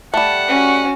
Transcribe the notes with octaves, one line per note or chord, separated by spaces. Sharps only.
G3 A3 F#5 A5
C#4 F#4